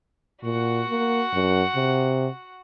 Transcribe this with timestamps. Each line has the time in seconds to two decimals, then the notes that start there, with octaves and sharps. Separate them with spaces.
0.44 A#2 F#4 F#5
0.88 A#3
1.33 F#2
1.75 C3